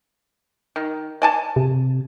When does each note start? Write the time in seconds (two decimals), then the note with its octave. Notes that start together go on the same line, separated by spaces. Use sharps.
0.76 D#3
1.22 D5 G#5 A5
1.56 C3